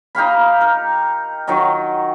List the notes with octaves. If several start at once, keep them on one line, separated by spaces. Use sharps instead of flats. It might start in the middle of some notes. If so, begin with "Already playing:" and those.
D#4 G4 F5 B5
A#4
D#3 F#3 D#5